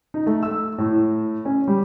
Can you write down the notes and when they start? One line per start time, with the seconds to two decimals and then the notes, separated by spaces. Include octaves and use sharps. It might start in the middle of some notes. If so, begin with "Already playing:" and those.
0.14 D#4
0.26 A3
0.43 E6
0.78 A2
1.45 C#4
1.68 G3